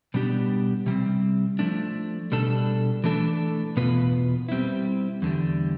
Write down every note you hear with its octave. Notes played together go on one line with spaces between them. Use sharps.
B2 G3 B3 D4 G4
C3 G3 C4
F3 A3 D4
B2 G3 D4 A4
E3 A3 D4 A4
E2 B2 B3 F4 B4
G3 C4 E4
E2 D3 G3